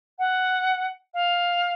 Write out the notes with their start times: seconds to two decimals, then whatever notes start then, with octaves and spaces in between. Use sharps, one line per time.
0.19 F#5
1.14 F5